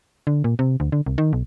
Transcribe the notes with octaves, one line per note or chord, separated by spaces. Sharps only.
D3
A#2
C3
D2
D3
C2
D#3
B1